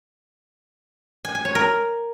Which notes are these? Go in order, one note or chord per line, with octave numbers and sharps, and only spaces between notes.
G#5
G#5
C#5
A#4